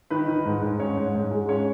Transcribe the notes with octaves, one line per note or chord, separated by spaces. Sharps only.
D#3 B4
D#3
G#2
G#2
C#4 C#5
G#2
G#2
G#3
C#4 C#5